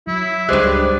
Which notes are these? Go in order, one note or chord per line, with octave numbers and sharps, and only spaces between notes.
F#3 E4
C#2 G2 G#3 G4 C5 D5 F#6